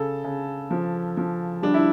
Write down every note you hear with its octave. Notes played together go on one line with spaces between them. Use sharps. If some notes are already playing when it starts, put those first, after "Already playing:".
Already playing: C#3 A4
C#3
F3
F3
G3 D4
E4